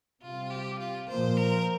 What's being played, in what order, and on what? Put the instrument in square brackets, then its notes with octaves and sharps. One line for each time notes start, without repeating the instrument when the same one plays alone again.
[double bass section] C3 G3 C4 [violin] F4
[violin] G4
F4
[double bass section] A#2 F3 A#3 [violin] C5
[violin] A#4